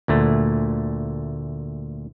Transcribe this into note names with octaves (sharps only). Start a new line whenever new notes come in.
D2 A#2 A3